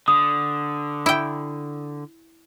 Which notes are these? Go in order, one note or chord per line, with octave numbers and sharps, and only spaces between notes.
D3 D#6
E4 G5